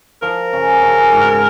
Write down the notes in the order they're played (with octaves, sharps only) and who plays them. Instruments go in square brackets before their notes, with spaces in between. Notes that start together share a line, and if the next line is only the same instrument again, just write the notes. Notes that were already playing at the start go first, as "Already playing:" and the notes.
[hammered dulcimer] F3 [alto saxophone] A#4
[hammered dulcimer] C#3
C#3
G#2